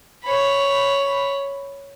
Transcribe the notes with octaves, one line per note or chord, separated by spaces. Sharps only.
C#5 B5